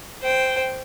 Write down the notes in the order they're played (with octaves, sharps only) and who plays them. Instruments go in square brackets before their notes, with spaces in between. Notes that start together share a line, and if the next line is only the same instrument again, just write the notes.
[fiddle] C5 G5